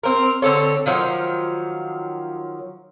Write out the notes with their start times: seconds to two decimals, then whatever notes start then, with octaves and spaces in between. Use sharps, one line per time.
0.03 C4 A#4
0.42 D3 C4 A4 C#5
0.86 D#3 F3 F#3